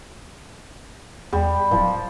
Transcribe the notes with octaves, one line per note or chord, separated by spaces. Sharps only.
E2 G3
D1 F3